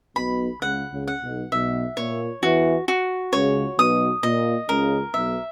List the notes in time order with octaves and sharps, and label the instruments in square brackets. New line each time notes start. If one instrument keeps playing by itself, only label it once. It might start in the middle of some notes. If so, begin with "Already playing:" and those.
[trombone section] B1 B2 [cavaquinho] B5
[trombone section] C#2 C#3 [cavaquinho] F#5
[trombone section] C#2 C#3
[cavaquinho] F#5
[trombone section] B1 B2
[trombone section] B1 B2 [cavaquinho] E5
[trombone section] A#2 [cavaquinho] C#5
[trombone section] E2 E3 [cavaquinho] F#4
[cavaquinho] F#4
[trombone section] C#2 C#3 [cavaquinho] C#5
[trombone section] B1 B2 [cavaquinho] D#6
[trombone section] A#2 [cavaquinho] D#5
[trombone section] C#2 C#3 [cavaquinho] A#4
[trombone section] B1 B2 [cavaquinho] E5